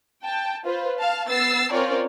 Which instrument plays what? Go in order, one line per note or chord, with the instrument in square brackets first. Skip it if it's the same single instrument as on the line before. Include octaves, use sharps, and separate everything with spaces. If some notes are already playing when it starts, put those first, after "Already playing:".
[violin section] G5 A5
F4 B4 C5
F5 A5
B3 E6 A6 C7
C4 C#4 F4 A#4 C#5 D5